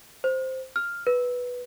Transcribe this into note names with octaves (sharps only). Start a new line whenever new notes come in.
C5
F6
B4